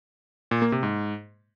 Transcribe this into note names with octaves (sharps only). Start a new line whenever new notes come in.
A#2
A#3
C3
G#2